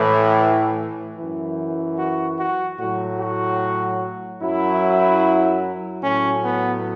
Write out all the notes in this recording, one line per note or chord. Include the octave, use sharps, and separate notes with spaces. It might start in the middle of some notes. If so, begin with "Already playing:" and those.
Already playing: A2 E3
F#2 E3
F#4
F#4
A2 F#3 F#4
F#4
F#2 F#3 E4
A2 F#3 C#4
B3